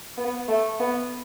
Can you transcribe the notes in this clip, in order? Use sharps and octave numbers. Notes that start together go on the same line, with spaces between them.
B3
A3
B3